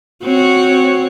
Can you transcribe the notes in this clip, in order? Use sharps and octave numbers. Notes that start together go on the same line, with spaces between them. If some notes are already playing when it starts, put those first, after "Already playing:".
C4 F#4 C#5